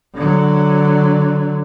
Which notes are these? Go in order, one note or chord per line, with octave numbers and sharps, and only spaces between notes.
D3 F#3